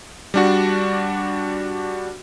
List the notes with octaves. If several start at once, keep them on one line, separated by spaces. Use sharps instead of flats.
G3 D4 F#4